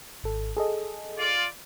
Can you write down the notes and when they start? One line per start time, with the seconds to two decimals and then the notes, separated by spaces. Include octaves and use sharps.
0.23 G#1 A4
0.57 G#4 A4 D#5
1.18 F4 D5